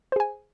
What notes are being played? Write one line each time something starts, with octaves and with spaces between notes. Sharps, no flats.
G#4 C5 G#5